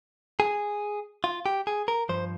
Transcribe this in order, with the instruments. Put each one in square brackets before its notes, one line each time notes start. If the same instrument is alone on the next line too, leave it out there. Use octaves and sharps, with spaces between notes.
[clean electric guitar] G#4
F4
G4
G#4
A#4
G2 F3 C5